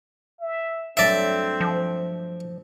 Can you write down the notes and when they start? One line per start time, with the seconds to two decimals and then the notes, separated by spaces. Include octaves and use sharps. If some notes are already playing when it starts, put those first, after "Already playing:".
0.40 E5
0.97 G2 F#3 A3 C4 D5 E5
1.61 F3